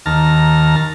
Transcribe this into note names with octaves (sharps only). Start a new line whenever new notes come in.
D#2 A5 A#5 F6